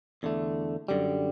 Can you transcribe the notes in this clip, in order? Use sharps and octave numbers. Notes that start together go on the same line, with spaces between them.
E2 D3 A3
F#2 D3 G3